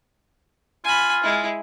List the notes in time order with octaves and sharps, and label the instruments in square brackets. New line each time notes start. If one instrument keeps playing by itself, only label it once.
[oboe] F4 [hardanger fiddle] G#5 B5
[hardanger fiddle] G#3 E4